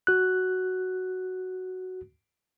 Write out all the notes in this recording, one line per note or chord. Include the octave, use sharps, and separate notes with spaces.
F#4 F#6